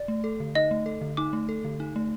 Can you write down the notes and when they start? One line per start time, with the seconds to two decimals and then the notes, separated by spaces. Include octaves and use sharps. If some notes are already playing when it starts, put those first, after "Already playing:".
Already playing: D5
0.08 A3
0.24 A4
0.40 D3
0.55 D#4 D#5
0.71 A3
0.86 A4
1.01 D3
1.17 D#4 D6
1.33 A3
1.49 A4
1.65 D3
1.80 D#4
1.96 A3